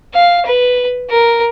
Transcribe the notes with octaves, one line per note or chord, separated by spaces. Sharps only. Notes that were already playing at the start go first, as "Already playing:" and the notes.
F5
B4
A#4